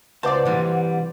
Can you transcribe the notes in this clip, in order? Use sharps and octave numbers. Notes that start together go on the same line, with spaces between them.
C#2 B4 C5 D5 F#5 A5
C3 E3 G3